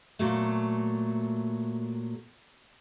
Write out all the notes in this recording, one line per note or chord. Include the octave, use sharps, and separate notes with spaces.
A#2 F#3 A3